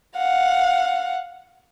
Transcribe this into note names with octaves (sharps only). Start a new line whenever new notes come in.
F5 F#5